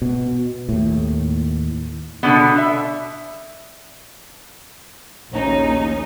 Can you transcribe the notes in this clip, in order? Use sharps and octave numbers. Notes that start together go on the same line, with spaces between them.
B2
D#2 A2
B2 D3 B3
E5
A#1 D#2 C#4 D#4